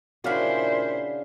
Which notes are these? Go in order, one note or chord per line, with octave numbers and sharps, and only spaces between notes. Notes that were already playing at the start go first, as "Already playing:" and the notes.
A#2 C#3 D4 E4 F#4 C5 D5 F5